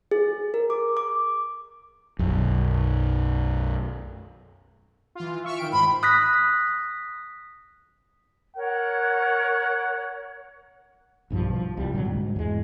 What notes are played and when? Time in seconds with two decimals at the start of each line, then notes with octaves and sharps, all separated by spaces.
0.11 G#4
0.54 A#4
0.70 D6
0.97 D6
2.19 B1 F#2
5.15 E3 F4
5.44 E5 C#6 F6
5.58 D#3 G5 D7
5.73 G#2 B5 C6
6.03 D#6 F#6 A#6 B6
8.56 A#4 C#5 F#5
11.30 B1 G2 D#3 F3
11.56 F3
11.77 C2 G3
11.93 A#2 D3 F#3
12.05 G#2
12.36 E2 G#3